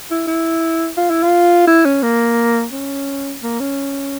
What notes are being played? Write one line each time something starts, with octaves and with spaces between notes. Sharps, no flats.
E4
E4
F4
E4
F4
E4
C#4
A#3
C#4
A#3
C#4